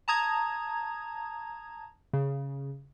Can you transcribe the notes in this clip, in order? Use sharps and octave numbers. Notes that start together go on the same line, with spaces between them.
A5 A#5 D#6 G#6
C#3